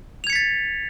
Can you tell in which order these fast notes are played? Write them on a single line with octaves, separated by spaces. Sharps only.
F7 G#6 C#7 B6 A6